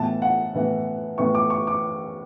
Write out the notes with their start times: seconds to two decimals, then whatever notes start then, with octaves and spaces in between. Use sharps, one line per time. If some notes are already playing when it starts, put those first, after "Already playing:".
Already playing: A2 E3 B3 A5
0.22 F#5
0.54 A2 E3 B3
1.18 A2 E3 B3 C#6
1.35 D6
1.50 C#6
1.67 D6